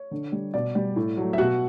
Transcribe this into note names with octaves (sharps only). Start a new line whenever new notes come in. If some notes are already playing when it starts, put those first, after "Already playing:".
Already playing: C#5
D3
G3
B2 D5
G3
A2
F#3 A3
E5
B2 F#4 F#5